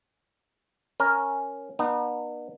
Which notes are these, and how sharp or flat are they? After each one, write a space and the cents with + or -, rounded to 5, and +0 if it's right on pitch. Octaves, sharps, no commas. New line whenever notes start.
C#4 +0 A#4 +0
B3 -35 D#4 -45